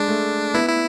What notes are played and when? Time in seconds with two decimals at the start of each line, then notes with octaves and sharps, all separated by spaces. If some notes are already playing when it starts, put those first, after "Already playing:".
Already playing: G#3 D4
0.08 A3
0.54 B3 E4
0.69 E4